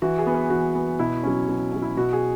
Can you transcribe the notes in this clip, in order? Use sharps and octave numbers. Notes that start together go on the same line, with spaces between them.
E3 F#4
G#4
B3
B4
E3 F#4
B3
B2 E4
F#3 C#4
B2
F#3 C#4
E4
B2 F#4
G#4